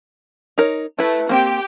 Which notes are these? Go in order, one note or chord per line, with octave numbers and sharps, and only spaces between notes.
D#4 A#4 C#5
A3 E4 B4
A#3 C4 G4 G5